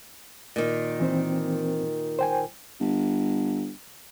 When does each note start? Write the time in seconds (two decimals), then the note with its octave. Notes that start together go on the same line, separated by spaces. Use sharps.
0.56 A#2 D#3
1.00 E3 C4 C5
2.19 C5 G5 G#5
2.80 G1